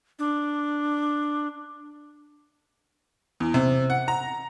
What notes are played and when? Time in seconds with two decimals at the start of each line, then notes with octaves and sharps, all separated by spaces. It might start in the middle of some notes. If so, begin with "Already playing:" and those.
0.19 D4
3.40 E2
3.54 C3
3.90 F#5
4.08 A#5